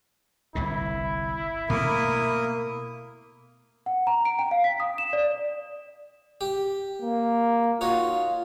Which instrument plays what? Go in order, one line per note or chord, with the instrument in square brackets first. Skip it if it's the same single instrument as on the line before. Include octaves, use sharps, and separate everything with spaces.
[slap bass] G1 C2 A2 [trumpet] E4
[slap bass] B2 A3 [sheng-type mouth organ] A#3 A#4 D#6
[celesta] F#5
A#5
D7
G5
F5
B6
D#6
E7
D5
[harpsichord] G4
[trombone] A#3
[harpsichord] D#4 F#4 C#5 [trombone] F4